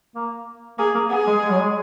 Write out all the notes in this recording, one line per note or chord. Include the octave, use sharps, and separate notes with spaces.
A#3
A#3 G#4
A#3
B3 G#4
G#3
G#3
F#3
G#3